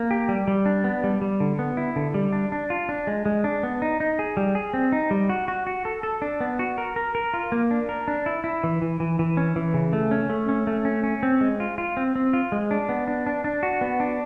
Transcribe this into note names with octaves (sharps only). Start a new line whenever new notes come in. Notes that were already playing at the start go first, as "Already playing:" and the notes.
Already playing: A#3
G4
G3
G3
D4
B3
G3
G3
D3
B3
E4
D3
G3
D4
D4
F4
D4
G#3
G#3
D4
B3
D#4
D#4
G#4
G3
G#4
C4
D#4
G3
F#4
F#4
F#4
A4
A4
D4
B3
F#4
A#4
A#4
A#4
F4
A#3
D4
A#4
D4
E4
E4
E3
E3
E3
E3
C#4
E3
C#3
A3
C#4
A3
C#4
A3
C#4
C#4
C4
G#3
F4
F4
C4
C4
F4
G#3
D4
B3
D4
D4
D4
F#4
B3
D4